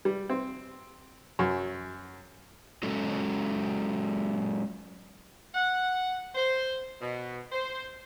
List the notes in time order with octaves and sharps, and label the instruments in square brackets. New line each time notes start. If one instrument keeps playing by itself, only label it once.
[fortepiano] G3
C4
F#2
[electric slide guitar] F#3 G#3 C#4 A4
[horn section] F#5
C5
B2
C5